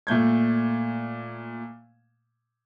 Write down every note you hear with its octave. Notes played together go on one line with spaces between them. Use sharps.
A#2 A3 G6 G#6